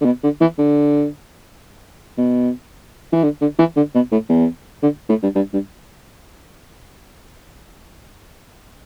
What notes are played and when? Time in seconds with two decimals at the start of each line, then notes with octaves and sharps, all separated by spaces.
0.01 D3
0.05 B2
0.23 D3
0.41 E3
0.58 D3
2.17 B2
3.13 E3
3.23 D3
3.41 D3
3.59 E3
3.76 D3
3.95 B2
4.12 A2
4.29 E2
4.83 D3
5.09 A2
5.23 G2
5.36 G2
5.53 G2